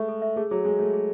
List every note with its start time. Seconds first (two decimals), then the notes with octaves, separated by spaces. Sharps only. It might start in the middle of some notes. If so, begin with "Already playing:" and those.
Already playing: G#3 A3 E5 C#6
0.09 A4
0.22 E5
0.36 A3 G#4
0.51 F#3 G#4
0.64 G#3 G#4
0.78 A3 G#4
0.94 G#4